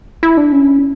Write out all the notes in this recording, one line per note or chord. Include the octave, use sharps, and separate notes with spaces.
E4
D4
C#4